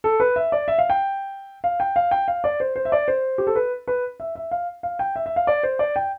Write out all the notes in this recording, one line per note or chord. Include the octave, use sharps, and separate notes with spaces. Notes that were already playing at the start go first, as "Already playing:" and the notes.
A4
B4
E5
D5
E5
F5
G5
F5
G5
F5
G5
F5
D5
C5
C5
E5
D5
C5
G4
A4
B4
B4
E5
E5
F5
F5
G5
E5
E5
F5
D5
C5
D5
G5